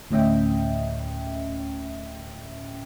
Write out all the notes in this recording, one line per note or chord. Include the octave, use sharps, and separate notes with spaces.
D2 A2 C#4 D#5 E5 G5